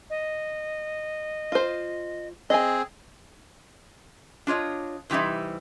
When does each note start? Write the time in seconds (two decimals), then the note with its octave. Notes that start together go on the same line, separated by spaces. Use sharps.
0.10 D#5
1.52 F4 C5
2.50 C4 G#4 D#5 G#5
4.47 D4 F4 C#5 D#5
5.10 C3 E3 G3 D#4 E4